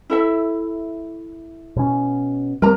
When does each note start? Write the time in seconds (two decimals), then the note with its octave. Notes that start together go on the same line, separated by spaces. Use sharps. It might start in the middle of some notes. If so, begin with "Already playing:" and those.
0.10 E4 A4 E5
1.76 B2 C#4
2.62 G3 A#3 C4 A#4 A#5